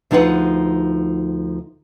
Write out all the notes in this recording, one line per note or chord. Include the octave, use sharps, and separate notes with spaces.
D2 F3 D#4 G#4 B4 F#5